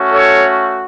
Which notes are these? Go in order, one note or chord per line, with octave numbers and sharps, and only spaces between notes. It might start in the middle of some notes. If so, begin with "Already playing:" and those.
Already playing: A3 C#4 F#4
A4 C#5